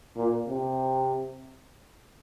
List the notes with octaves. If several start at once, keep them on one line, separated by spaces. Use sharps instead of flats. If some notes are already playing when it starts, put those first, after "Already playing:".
A#2
C3